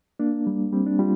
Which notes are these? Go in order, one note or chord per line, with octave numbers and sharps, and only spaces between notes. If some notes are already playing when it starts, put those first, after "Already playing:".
A#3 D4
G3
G3 C4
D4
G3 F4